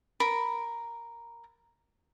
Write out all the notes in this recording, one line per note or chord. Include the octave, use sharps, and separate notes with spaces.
A#4 B5